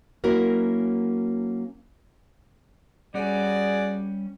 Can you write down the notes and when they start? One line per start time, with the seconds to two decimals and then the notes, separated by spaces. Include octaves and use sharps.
0.24 F#3 A#3 C#4 E4 F#4 A#4
3.14 G3 C#4 F#4 G#4 D5